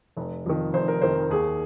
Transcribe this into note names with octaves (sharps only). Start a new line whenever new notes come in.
F1
F2 D#3
F1 C5
A#4
F2 D#3 C5
D#2 G#4